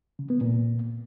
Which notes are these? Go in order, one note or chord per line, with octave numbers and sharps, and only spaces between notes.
C#3
B3
A#2